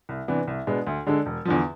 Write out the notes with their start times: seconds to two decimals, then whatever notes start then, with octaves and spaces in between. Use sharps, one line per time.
0.09 C2
0.28 C3 E3 B3 D4
0.47 C2
0.67 B2 G#3 B3 D4
0.87 D2
1.07 D3 G#3 D4 A4
1.26 E1
1.45 E2 D3 F3